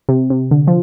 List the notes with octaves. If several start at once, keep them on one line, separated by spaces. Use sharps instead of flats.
C3
C3
D3
F3